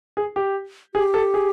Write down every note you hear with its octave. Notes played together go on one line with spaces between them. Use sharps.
G#4
G4
G4 G#4
A4
G#4